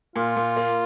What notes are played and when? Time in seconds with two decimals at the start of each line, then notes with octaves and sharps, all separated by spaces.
0.16 A#2 F4
0.36 A#2
0.57 A#3